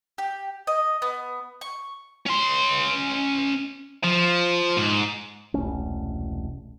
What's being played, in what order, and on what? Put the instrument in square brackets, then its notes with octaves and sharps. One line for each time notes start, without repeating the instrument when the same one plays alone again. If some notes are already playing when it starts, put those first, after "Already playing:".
[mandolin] G4
D#5
B3
C#6
[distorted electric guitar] C#4 C6
F3
G#2
[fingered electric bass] E1 C2 A3 C#4